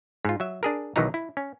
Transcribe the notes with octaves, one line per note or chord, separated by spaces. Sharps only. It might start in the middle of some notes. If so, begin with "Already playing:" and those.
G#2 F4
F#3 E5
D4 G#4 A#4
B1 D#3 E3 F#3 D#4 A#5
E4
C#4